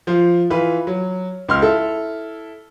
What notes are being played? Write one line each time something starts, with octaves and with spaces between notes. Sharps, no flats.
F3 F4
E3 F4 B4
F#3
C#2 C6 F6
E4 A4